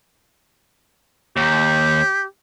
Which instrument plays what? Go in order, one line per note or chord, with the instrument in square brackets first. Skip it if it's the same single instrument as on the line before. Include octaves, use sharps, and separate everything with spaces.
[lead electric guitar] D#2 [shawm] G4